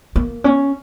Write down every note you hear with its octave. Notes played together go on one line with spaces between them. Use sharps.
A#3
C#4